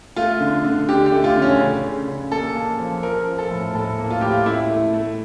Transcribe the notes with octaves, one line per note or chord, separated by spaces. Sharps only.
A3 F4
D3
D3
D3 G4
G4
A3
F4
D3
C#4
C#3
C#3
C#3
A#3 A4
A#3
F3
F3 A#4
F3
A4
A2
A2 A4
A#3
F4
A2 G4
F4
A3 E4
A3
A3